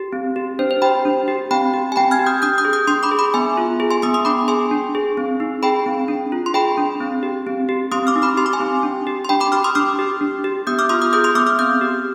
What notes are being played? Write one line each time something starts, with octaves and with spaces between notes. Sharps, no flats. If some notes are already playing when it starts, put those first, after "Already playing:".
Already playing: G4
C4
G4
D4 C5
C5
G4 G5 B5
D4
G4
C4 G5 B5
G4
G#5
C4 G5 B5
F6 G#6
G4
D#6 G6
D4 D#6 G6
D#6 G6
G#4
D#6 G6
D4 C6 D#6
B5 D6
G#4
B5 D6
B3 G#5 C6
F4
G#4
G#5 C6
B3 C6 D#6
C6 D#6
D4 B5 D6
G#4 G#5 C6
D4
G#4
C4
D#4
G#4 G5 B5
C4
D4
F4
C6
G#4 G5 B5
D4
C4
G4
C4
G4
C4 C6 D#6
D6 F6
D#4
B5 D6
G4 C6
D6
G#5 C6
C4
D4
G4
C6
D4 G5 B5
B5 D6
G4 D6 F6
C6 D#6
D4 D6 F6
G4
D4
G4
B3 D#6 G6
D6 F6
F4 C6 D#6
D#6 G6
G#4 D#6 G6
C6 D#6
B3 D6 F6
D6 F6
C4 D#6 G6
G4